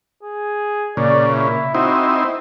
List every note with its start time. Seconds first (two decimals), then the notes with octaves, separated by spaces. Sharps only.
0.23 G#4
0.97 A#2 C#3 D5
1.33 E4
1.75 C4 D#4 E4 F#4